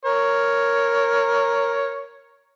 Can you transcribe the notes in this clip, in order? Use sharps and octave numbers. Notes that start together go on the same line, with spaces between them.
A#4 C#5